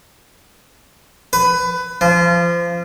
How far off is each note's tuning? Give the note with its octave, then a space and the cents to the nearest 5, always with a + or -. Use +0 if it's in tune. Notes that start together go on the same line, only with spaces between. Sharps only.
B4 +20
F3 -25